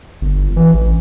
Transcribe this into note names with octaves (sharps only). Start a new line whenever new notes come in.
G1
E3
A1